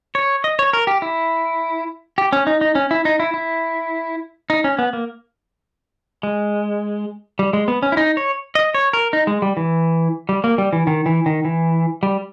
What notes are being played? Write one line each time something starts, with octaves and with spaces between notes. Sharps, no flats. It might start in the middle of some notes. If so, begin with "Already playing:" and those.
C#5
D#5
C#5
A#4
G4
E4
G4
C#4
D#4
D#4
C#4
E4
D#4
E4
E4
D#4
C#4
B3
A#3
G#3
G3
G#3
B3
C#4
E4
D#4
C#5
D#5
C#5
A#4
D#4
G#3
G3
E3
G3
A#3
G3
E3
D#3
E3
D#3
E3
G3